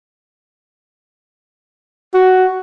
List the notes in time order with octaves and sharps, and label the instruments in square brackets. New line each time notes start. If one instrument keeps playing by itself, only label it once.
[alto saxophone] F#4